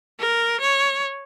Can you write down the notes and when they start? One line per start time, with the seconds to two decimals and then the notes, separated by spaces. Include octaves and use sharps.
0.20 A#4
0.61 C#5